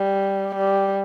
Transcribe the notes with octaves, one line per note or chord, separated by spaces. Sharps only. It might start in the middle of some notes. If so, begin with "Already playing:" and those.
Already playing: G3
G3